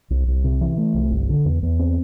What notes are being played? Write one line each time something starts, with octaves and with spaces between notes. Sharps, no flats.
C2
C2
C3
E3
A3
C2
G1
D3
E2
E2
C4